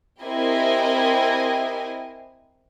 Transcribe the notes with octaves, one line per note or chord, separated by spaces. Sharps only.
C4 E4 G4 A#4 D#5 G#5